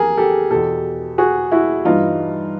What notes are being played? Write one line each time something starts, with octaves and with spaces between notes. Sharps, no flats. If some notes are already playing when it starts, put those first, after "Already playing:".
Already playing: F2 E3 G#4 A#4
G4 A4
E2 B2 G4 A4
F#4 G#4
E4 F#4
G2 E3 D#4 F4